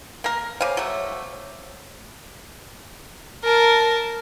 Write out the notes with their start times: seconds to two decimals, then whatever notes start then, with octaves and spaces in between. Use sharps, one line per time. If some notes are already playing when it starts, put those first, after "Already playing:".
0.24 A#3 A#4
0.61 C#3 C5 C#5 F5 D6
0.77 F#3 A3
3.44 A#4 A5